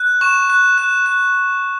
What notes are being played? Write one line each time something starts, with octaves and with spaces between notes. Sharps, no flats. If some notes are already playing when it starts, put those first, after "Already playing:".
Already playing: F#6
C#6 E7
F#6
F#6
F#6